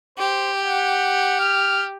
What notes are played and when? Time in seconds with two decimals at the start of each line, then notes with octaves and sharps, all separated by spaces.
0.18 G4 C5
0.65 F#5
1.40 F6